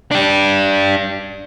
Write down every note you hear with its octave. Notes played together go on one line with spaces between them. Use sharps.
D4 G4